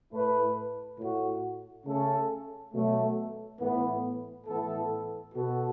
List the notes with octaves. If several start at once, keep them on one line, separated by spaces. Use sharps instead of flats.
A2 A3 E4 B4
A2 A3 F#4
C#3 A3 C#4 A4
B2 F#3 A3
A2 E3 B3
A2 E3 B3 E4 A4
B2 B3 F#4 A4